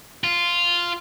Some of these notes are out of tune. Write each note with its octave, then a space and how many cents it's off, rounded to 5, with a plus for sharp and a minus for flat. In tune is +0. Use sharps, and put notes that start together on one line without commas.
F4 -5